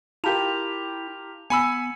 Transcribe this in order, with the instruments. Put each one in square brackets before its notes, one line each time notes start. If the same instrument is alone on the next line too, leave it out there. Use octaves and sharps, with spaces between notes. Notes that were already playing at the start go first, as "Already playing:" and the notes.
[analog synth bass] E4 [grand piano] F4 G4 A#4 [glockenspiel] A5 A#5 F7
[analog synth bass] B3 [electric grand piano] G#5 B5 E6 [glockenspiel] C#7